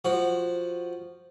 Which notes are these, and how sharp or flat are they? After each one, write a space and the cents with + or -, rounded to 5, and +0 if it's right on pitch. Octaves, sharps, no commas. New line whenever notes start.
F3 +0 F#4 +0